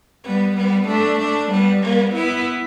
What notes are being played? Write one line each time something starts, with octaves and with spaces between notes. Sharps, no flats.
G3 B3
G3 B3
A3 D4
A3 D4
G3 B3
G3 B3
B3 E4